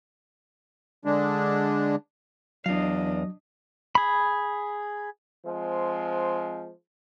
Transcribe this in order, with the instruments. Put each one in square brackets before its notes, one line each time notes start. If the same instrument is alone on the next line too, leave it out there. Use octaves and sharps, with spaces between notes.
[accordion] D3 G#3 D4
[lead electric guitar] E2 F5 [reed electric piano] F#3 [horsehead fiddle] D4 D#5
[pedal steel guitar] G#4 B5
[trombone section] F3 G#3 C4